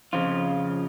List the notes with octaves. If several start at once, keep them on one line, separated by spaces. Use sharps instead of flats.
F2 C#3 F3 F4